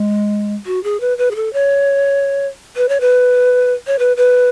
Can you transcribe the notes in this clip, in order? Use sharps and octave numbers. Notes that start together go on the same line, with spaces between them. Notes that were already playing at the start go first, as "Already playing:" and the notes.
Already playing: G#3
F#4
G#4
B4
B4
G#4
A4
C#5
B4
C#5
B4
C#5
B4
B4